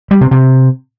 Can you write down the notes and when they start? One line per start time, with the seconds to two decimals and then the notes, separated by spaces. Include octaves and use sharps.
0.11 G3
0.21 C3
0.31 C3